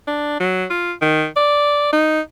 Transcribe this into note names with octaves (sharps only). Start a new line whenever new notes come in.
D4
F#3
F4
D#3
D5
D#4